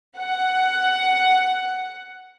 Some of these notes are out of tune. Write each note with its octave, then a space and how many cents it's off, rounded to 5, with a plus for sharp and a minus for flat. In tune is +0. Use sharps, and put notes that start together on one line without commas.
F#5 +10